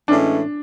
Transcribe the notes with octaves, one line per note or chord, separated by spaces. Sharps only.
A2 E3 G#3 C#4 D4